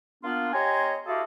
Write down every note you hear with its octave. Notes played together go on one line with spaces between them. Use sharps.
A#3 B3 D4 F4
G4 C#5 D#5 G#5 A#5 C6
E4 F#4 G4 A4 D#5 F5